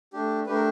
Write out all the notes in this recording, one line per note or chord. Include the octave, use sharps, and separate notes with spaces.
A3 D4 G4
A3 D4 G4 B4
A#4